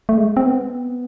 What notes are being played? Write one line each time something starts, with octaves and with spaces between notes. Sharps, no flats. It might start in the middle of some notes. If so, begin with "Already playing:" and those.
A3
G#3
C4
B3